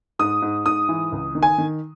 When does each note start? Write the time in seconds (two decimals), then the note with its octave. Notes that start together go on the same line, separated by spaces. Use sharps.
0.19 G#2 D#6
0.42 G#2
0.66 G#2 D#6
0.89 E3
1.12 C#2
1.35 D#3
1.43 G#5
1.58 D#3